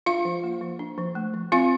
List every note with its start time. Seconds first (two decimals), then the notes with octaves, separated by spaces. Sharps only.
0.06 D4 F4 F5
0.25 F3
0.44 A#3
0.61 F3
0.79 D4
0.98 F3
1.15 A3
1.34 F3
1.52 C4 F4 F5